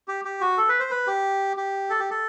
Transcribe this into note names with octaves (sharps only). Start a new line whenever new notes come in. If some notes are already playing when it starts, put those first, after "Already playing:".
G4
G4
F#4
A4
B4
C5
B4
G4
G4
A4
G4
A4